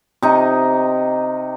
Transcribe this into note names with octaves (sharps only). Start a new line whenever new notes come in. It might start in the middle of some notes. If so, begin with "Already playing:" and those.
C3 D#4